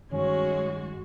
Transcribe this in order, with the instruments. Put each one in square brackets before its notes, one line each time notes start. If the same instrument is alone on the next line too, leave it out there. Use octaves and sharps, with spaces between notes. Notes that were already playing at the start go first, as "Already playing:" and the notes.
[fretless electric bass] G2 D#3 [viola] G#3 F#4 [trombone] C#4